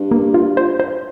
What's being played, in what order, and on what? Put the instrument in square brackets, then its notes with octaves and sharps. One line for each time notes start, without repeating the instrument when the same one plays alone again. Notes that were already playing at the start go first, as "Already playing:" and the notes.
Already playing: [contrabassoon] G2
[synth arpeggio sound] A#3
F4
C5
C5